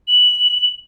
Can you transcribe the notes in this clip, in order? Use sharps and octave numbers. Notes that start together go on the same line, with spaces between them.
F#7